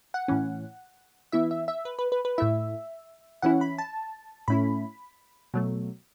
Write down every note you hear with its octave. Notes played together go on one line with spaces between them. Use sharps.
F#5
A2 E3 C#4
E3 B3 E4 E5
E5
E5
B4
B4
B4
B4
A2 A3 E4 E5
E3 C#4 E4 F#5
B5
A5
A2 A3 C#4 E4 B5
B2 F#3 A3